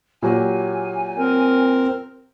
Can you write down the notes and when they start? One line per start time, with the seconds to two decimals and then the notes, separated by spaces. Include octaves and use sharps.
0.23 A#2 F#3 G4 G#5
1.18 C4 A#4